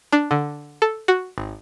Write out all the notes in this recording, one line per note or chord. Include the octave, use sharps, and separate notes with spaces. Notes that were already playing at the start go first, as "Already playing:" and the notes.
D4
D3
A4
F#4
G#1